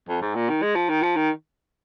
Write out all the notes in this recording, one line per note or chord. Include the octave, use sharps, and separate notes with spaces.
F2
G#2
A#2
D#3
G#3
F3
D#3
F3
D#3